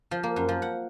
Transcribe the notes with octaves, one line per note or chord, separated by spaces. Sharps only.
F3
A#3
F#2
F3
F#5